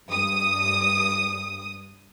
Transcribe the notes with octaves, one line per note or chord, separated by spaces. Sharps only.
G2 D#6